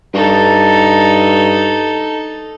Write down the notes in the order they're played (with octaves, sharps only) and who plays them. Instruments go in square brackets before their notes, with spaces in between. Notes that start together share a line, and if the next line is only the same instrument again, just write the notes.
[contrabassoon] G2 [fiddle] D#4 A4